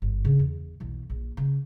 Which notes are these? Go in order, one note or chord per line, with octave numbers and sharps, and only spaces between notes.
G1
C#3 D4
E2
B1 E2
A#1
C#3